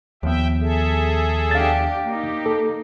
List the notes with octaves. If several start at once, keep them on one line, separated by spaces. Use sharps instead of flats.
D#2 F3 B3 E5 G5
G#4 A4 E5
D4 G4 F5 A6
A#3 D#4 G4
A4